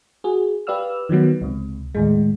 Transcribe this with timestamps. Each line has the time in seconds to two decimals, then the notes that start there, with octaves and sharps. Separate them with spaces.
0.24 F#4 G#4
0.67 G4 B4 D5 F5 E6 F6
1.09 D#3 F3 F#3 B3
1.41 C#2 C3
1.95 D#2 A2 G#3